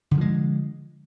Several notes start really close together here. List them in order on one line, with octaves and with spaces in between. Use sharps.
D3 D#3 F3 G#3